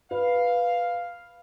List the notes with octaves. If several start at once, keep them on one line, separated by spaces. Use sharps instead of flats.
B4 F5